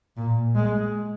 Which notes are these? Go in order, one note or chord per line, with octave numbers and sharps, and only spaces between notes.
A#2
G#3